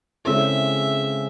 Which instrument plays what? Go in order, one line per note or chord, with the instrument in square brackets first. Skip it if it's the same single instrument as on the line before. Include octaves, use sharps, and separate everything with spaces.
[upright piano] C#3 G#3 C4 E4 A4 [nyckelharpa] E5